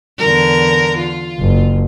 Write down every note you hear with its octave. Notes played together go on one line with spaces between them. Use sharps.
E2 D3 A#4
F4
F#1